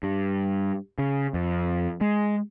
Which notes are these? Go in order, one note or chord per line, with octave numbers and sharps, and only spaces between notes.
G2
C#3
F2
G#3